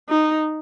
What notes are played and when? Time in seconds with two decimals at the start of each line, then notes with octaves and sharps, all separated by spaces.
0.09 D#4